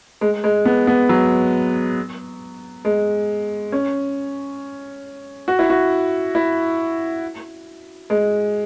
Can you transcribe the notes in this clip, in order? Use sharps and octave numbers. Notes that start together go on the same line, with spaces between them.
G#3
G#3
B3
B3
F#3
G#3
C#4
F#4
E4
F#4
E4
G#3